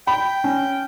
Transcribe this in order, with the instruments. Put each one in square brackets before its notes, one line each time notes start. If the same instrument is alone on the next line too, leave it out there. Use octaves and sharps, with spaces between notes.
[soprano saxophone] G5 [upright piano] B5
[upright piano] C#4